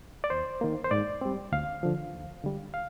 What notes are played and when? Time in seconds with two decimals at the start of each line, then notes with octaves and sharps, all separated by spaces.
0.24 D5
0.30 D#2 C5
0.61 D#3 A#3
0.84 C5
0.91 G#2 D5
1.21 G3 C4
1.52 D2 F5
1.83 D3 F3
2.14 D#2
2.44 D3 G3
2.74 F5